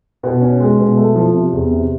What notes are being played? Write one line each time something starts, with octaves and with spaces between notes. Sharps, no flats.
B2
C#4
G#3
B2
A3
F3
C3
E2
C3